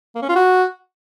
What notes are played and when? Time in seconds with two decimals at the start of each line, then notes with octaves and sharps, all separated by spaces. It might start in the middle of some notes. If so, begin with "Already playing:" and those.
0.15 A#3
0.22 C#4
0.29 F4
0.35 F#4